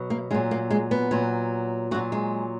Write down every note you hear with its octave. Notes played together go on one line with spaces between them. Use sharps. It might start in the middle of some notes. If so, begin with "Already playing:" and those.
Already playing: B2 F#3
A#3
A#2 F#3 G#3
A#3
G#3
B3
A#2 F#3
A#2 F#3 F#4
G#3